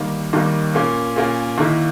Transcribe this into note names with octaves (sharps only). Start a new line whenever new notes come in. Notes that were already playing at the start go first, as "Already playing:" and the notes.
Already playing: D#2 D#3 G3 A#3
D#2 D#3 G3 A#3
A#2 A#3 C#4
A#2 A#3 C#4
D#2 D#3 A#3 E4